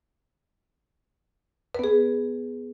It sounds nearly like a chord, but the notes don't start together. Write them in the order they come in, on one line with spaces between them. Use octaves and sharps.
B4 B3 G#4